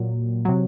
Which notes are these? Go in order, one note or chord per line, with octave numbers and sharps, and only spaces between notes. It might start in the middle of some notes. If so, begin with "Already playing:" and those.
Already playing: A#2 F#3
C3 F#3